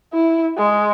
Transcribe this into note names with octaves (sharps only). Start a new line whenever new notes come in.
E4
G#3